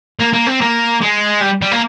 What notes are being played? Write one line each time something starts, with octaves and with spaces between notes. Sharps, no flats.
A#3
A#3
C4
A#3
G#3
G3
G3
A#3